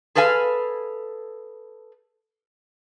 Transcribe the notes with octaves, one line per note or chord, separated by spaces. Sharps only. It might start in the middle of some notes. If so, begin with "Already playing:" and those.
G#4 A4 B4 F5 G#5